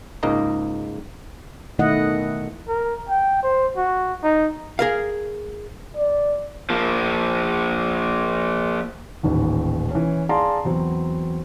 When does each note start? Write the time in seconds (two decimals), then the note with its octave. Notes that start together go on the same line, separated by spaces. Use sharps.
0.23 C#2 G#2 A#3 D#4 D#5 A#5
1.79 B2 D#3 A3 E4 D#5 F#5
2.68 A#4
3.09 G5
3.43 C5
3.76 F#4
4.23 D#4
4.79 G#4 A#4 F5
5.96 D5
6.70 F3 A#3
9.23 D#1 A1 D#2
9.90 E3 C#4
10.29 G#4 D5 F5 A5 A#5 C6
10.65 E2 F#3 C4